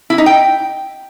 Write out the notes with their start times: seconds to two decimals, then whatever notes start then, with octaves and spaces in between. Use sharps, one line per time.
0.10 E4
0.18 D#4
0.26 G5